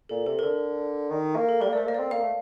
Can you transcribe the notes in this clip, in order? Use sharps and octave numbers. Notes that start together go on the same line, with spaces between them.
A#2 A4
C3 A4
A#4
D3 A4
D#3
A#3
A4
G3 A#4
A#3
A3 C5 D5
A#3 D#5
C4 D5
A#3 F5
A3